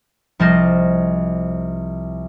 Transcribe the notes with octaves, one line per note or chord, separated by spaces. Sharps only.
C2 F3 C5 D#5